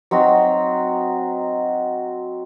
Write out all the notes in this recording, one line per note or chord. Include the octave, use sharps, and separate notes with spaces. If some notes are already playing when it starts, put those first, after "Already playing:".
F#3 C4 D#4 F#4